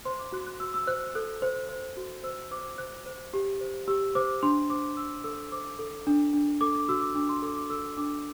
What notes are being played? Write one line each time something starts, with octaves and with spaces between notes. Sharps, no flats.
C5 C6
D6
F#4 F#6
F#6
F#4 E6
E6
C5 F#6
A4 F#6
C5
C5
F#4
C5 E6
C5 D6
C5 F#6
C5
G4
C5
G4 E6
C5 D6
D4 C6
C5 D6
D4 E6
A4 E6
C5 D6
A4
D4
D4
A4 D6
D6
F#4 E6
D6
D4 D6
C6
A4 D6
D6
A4 E6
D4 D6